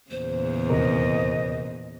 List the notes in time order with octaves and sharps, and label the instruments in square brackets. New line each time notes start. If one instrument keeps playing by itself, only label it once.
[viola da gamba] E2 A#2 C#3 [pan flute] C5
[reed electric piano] D#2 C3 A#4 [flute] D#5